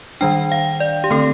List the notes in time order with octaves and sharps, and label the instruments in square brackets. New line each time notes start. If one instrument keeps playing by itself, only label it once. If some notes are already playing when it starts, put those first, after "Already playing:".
[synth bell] D#3 G3 D4 G5
F5
D5
G4
D3 A3 C4 A4